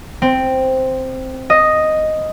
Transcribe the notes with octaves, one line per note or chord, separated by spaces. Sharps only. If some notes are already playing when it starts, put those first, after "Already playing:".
C4
D#5